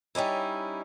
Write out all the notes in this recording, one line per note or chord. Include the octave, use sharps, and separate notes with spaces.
G3 C#4 D#4 E4